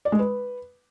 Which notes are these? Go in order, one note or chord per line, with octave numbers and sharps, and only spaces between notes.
D5
G#3
B4